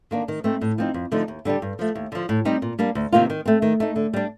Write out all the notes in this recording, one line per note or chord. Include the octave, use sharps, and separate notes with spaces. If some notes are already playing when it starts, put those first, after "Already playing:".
D#3 A#3 D4
D#3
A3 C4 D#4
A2
F3 C4 D#4
F2
D3 F3 A3 D#4
D#2
D3 G3 D4 G4
G2
F3 A3
D#2
D3 F3
A2
G3 C4 D#4 G4
A#2
G3 A#3 D4
D2
C3 D#3 A#3 F4
D#3
A3 C4
D#3
A3 D#4
D3
G3 D4